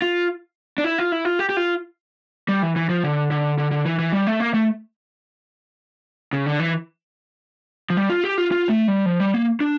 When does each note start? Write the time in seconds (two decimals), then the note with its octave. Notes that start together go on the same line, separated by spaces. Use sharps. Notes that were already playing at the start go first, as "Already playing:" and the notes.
0.02 F4
0.78 D4
0.84 E4
0.98 F4
1.12 E4
1.25 F4
1.39 G4
1.49 G4
1.57 F4
2.48 G3
2.62 E3
2.76 E3
2.89 F3
3.04 D3
3.31 D3
3.58 D3
3.71 D3
3.85 E3
3.99 E3
4.12 G3
4.27 A3
4.40 A#3
4.54 A3
6.33 C#3
6.46 D3
6.60 E3
7.90 F3
7.97 G3
8.09 F4
8.24 G4
8.38 F4
8.51 F4
8.69 A3
8.88 G3
9.06 F3
9.20 G3
9.34 A#3
9.60 D4